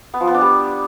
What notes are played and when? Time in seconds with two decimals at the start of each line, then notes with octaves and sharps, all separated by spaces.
0.14 B3
0.21 F3
0.27 B3
0.34 D4
0.41 G3